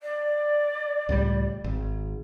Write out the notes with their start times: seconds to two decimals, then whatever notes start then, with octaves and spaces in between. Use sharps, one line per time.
0.02 D5
1.09 C#2 A2 G3
1.64 G#1